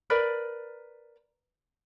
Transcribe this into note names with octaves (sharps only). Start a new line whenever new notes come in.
A#4 B4 D5